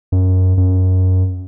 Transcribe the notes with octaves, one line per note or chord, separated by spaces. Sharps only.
F#2
F#2